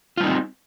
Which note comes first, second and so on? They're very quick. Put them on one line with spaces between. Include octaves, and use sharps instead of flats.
F4 G3 D#4 C4